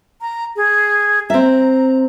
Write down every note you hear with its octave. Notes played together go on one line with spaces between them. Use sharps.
A#5
G#4
C4 E5 A#5